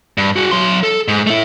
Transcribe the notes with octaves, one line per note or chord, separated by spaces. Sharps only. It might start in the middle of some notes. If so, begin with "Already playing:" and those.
G2
F#4 G#4
F#3 C6
A4
G#2
A3 E4